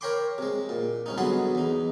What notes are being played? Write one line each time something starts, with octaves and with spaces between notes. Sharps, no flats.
A#4 C#5 G5 B5 C6 D6
C3 G#3
A#2
C2 C#4 D#4
D3 F#3 B3 G#4 B5 C6
E2 D#4